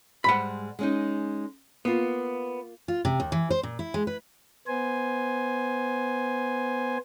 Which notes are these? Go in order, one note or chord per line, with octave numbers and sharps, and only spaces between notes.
G#2 G3 G#3 F#5 B5
G#3 C#4 D#4
A#3 B3 F4
F4
C3
D#2
E3
C5
A#2
E4
G#3
B4
B3 C5 G#5